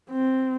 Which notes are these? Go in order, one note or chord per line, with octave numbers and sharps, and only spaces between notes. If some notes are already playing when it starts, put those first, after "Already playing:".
C4